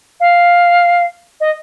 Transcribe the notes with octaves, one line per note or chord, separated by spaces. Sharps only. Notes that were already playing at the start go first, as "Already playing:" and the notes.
F5
D#5